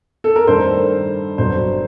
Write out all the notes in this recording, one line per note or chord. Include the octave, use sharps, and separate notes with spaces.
A4
A#4
G2 D#3 A3 C5
G1 G2 F#3 C5